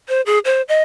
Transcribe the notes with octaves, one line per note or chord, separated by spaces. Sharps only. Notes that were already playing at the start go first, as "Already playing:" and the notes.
C5
G#4
C5
D#5